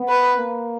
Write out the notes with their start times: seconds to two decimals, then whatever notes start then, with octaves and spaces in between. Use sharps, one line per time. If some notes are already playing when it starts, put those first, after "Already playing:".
Already playing: B3
0.08 B4
0.38 A#3